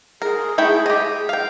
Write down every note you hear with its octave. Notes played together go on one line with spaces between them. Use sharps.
G#4 A#4
A3 E4 G5
G4 D#5
F5 G5